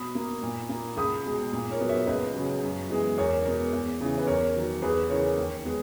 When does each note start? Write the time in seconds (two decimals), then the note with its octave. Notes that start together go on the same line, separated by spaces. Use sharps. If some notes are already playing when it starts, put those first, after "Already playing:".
Already playing: B2 B5 D#6
0.15 A#3
0.43 A#2
0.69 A#3
0.97 C#2 B5 D#6
1.25 B2 G#3
1.53 A#2
1.71 A#4 C#5
1.80 F#3 B3
1.89 C#5 E5
2.07 C#2 B4 D#5
2.34 C#3 F#3
2.63 F#2
2.89 E3 G#3 B3
3.18 E2 A#4 C#5
3.44 B2 G#3 B3 A#4
3.73 E2
4.01 C#3 E3
4.18 B4
4.27 E2 A#4 C#5
4.56 D#3 F#3
4.82 E2 G#4 B4
5.09 C#3 E3 A#4 C#5
5.37 D#2
5.65 G#3 B3